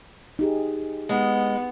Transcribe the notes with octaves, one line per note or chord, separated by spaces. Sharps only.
D#4 G4 G#4
G#3 B3